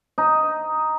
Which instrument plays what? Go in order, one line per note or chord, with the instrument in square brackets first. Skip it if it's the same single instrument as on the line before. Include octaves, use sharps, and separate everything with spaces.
[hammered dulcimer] D#4